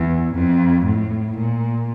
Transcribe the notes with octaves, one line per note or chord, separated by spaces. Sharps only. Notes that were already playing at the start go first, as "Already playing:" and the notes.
Already playing: E2
F2
A2
A#2